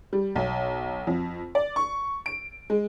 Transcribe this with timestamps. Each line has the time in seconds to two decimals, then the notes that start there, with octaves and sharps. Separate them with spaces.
0.13 G3
0.36 B1
1.07 F2
1.55 D5
1.76 C#6
2.26 D7
2.70 G#3